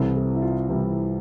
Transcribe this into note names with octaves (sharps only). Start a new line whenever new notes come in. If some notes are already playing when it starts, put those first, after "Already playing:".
Already playing: C2 C3 E3 G3 C4 A4
A4
E4
F4
C2 C3 E3 G3 C4